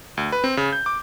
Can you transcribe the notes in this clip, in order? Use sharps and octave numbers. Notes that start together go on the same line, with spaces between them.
D2
B4
C4
C#3
G6
D6